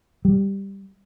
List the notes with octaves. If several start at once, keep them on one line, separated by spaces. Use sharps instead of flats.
G3